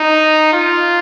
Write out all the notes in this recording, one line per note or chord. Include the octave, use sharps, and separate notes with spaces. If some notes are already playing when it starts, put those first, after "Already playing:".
Already playing: D#4
F4